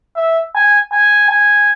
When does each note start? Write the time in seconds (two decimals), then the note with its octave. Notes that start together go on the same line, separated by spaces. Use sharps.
0.16 E5
0.55 G#5
0.92 G#5
1.30 G#5